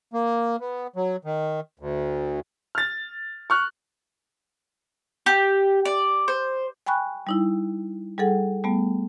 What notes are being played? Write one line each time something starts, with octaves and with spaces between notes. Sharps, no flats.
A#3
B3
F#3
D#3
D2
F6 A6
C#6 F6 F#6
G4
D5
C5
G5 G#5 B5 C#6 F#6
G3 D#4 E4
G3 G#4 A4 F#5
G3 A3 B3